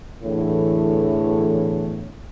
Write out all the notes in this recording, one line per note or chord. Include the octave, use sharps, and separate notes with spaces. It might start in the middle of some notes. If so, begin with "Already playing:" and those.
E2 A2 D3 E3 A4 C#5